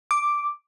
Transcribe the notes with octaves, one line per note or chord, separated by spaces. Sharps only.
D6